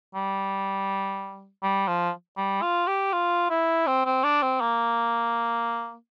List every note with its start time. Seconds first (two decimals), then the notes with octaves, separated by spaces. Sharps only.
0.14 G3
1.63 G3
1.88 F3
2.37 G3
2.62 F4
2.87 G4
3.13 F4
3.50 E4
3.87 C4
4.06 C4
4.24 D4
4.42 C4
4.61 A#3